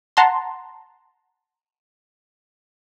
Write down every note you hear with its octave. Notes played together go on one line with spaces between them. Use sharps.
F#5 A5 A#5 C6